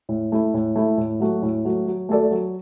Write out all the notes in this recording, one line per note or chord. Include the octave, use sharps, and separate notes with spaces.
A2
A3 E4
A2
A3 E4
A2
F#3 A3 F#4
A2
F#3 A3 F#4
F#3
A3 F#4 A4 D5
F#3